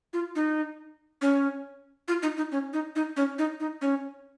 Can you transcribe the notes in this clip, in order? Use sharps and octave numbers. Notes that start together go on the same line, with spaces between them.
F4
D#4
C#4
F4
D#4
D#4
C#4
D#4
D#4
C#4
D#4
D#4
C#4